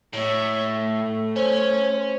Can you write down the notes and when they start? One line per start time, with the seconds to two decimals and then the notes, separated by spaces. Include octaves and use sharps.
0.14 A2 C#5 E5
0.77 A3
1.36 C#4 C5